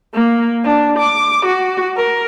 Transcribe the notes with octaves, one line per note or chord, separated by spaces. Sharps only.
A#3
D4
D6
F#4
A#4